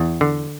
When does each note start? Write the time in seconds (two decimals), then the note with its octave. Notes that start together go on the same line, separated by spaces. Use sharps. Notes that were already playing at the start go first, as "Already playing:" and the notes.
Already playing: E2
0.21 D3